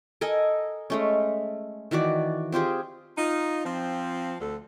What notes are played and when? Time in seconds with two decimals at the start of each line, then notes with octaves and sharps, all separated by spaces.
0.21 A4 A#4 D#5 G#5
0.90 G#3 A3 C#4
1.91 D#3 E3 F#4 D5
2.52 C4 F4 G4 G#4
3.17 D#4 F4
3.65 F3 C4
4.40 D2 A4